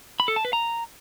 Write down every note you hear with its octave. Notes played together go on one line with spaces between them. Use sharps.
B5
A4
A5
B4
A#5